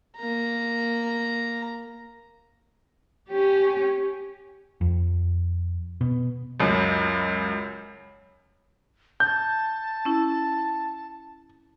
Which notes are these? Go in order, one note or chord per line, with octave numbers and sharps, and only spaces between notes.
A#3 A#5
C#4 G4
F2
B2
C#2 F#2
A5 G6
C#4 E4